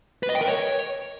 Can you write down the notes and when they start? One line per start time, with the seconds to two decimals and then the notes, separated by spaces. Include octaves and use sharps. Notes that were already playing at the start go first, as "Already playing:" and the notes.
0.23 B4
0.29 D#5
0.35 G5
0.41 A#4
0.47 C#5